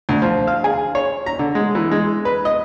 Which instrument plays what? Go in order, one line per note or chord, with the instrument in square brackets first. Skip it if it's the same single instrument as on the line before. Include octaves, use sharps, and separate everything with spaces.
[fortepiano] D2
F3
F5
G#4
C#5
A#5
D3
G#3
E3
G#3
B4
D#5